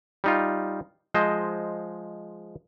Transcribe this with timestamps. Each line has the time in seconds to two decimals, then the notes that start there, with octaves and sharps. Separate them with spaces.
0.24 G3 D#4 F4
1.14 F3 G#3 C5 D#5